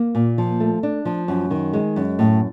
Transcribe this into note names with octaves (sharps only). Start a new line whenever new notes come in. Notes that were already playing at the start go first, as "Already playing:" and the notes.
Already playing: A#3
A#2
F3
A3
D4
F3
F#2
D#3
G#3
F#2
A2